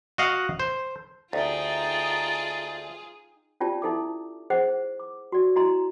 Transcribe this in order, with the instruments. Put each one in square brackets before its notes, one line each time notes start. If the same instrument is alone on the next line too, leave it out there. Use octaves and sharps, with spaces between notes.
[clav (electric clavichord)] F#4 D#5 F5 F#5
C5
[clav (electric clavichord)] D2 [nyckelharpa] D#4 G5 [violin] F4 G#4 [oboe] A5
[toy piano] C#4 D#4 F4 G4 D5 A5
D#4 E4 A4 E5 D6
G#4 C5 D#5 F#5
D6
F#4 D5
E4 F#4 D#5 A#5 C6